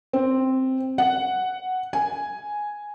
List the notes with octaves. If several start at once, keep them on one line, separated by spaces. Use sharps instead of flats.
C4
F#5
G#5